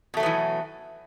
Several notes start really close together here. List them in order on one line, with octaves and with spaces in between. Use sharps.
B2 A3 F#3 B3 E3